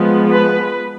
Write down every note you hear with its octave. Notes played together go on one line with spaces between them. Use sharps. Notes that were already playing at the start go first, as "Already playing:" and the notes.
Already playing: F3 G#3 B3
B4